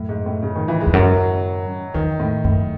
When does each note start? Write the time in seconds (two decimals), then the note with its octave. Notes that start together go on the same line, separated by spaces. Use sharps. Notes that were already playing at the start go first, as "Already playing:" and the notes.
Already playing: F#2 A2
0.09 G#2
0.26 A2
0.43 C#3
0.56 D#3
0.68 E3
0.81 G#3
0.87 E2
0.93 F#2 F#3
1.94 E2 D#3
2.20 A2
2.44 F#2 A2